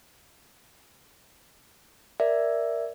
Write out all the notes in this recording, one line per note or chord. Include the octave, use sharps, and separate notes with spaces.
A#4 D5 E5